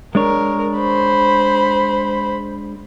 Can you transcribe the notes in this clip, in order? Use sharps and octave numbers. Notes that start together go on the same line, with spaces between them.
G#3 D4 A#4 C#5
C5 B5